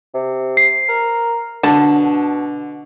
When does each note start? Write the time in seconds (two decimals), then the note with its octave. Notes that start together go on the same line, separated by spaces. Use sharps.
0.14 C3
0.57 C7
0.89 A#4
1.63 B2 D3 A5